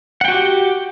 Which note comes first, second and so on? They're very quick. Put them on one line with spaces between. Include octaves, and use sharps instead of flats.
F#5 G5 F#4 G4